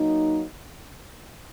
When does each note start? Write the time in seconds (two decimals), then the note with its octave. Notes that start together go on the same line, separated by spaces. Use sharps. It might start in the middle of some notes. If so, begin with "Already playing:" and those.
Already playing: F#3 A#3 D#4